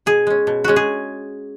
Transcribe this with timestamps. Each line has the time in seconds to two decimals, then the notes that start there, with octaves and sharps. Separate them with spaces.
0.06 B2 G#4
0.27 G#3 C#4
0.47 B2
0.64 G#3 C#4 F#4
0.76 G#4